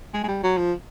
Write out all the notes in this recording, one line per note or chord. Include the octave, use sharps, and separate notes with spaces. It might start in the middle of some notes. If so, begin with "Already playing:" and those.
G#3
G#3
G3
F#3
F3